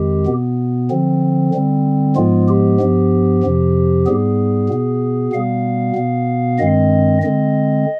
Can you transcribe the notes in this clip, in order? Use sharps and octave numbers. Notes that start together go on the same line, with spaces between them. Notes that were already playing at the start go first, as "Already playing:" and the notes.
Already playing: F2 D#3 G#3 G4
B2 B3
D3 F3 C4
D3 G3 C4
G#2 F3 G#3 B3 F4
G4
G2 F3 B3
F2 C3 F3
G#2 G3 B3 G#4
B2 B3
B2 G3 B3 F5
B2 B3
G2 D#3 G#3 C4 D#5
D3 G#3 C4 D#5